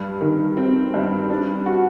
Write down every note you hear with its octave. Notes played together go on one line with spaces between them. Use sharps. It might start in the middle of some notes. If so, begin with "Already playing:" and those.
Already playing: G2
D#3
C4
G2
D4
F#4